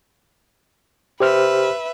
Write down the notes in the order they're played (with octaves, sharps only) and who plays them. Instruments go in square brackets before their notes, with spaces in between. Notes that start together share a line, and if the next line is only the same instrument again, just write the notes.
[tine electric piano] G4 C5 F6 [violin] B4 E5